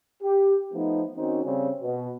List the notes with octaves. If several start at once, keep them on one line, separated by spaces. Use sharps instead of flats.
G4
F3 A3 B3 D#4
D#3 C4 C#4 D#4 F#4
C#3 G3 C4 C#4
B2